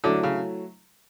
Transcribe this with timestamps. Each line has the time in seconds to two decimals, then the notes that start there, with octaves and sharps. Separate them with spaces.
0.04 D3 F#3 A3 E4
0.23 C#3